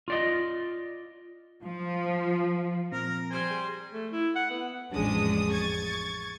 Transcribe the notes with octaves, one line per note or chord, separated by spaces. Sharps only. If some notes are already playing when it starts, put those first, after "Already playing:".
F4 D5 D#5
F3
A#2 F3 C4 A#4
G3 C5 G#5
G#4
A3
E4
F#5
B3
A1 F2 G#3 C#4 D4 D#6
C#6 G#6 A6